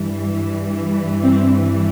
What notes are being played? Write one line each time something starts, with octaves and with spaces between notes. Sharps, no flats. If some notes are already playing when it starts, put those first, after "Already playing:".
Already playing: G2 E3 G3
C4